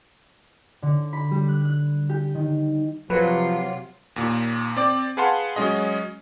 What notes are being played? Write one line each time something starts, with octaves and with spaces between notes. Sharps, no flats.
D3
B5
G3
F#6
F#6
G4
D#3
C3 F3 F#3 F4 B4
D#2 A#2
C4 D5 D6
G#4 B4 F5 F#5 A5 C6
F#3 G#3 C#4 G#4 D#5